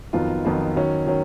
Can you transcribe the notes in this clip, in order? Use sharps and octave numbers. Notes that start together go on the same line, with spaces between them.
F2 D#3 F#3 B3 F4
F2 D#3 F#3 B3 F4
D#3 F#3 C#4
D#3 F#3 C#4